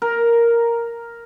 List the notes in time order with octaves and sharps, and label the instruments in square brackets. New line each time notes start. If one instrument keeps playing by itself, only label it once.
[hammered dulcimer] A#4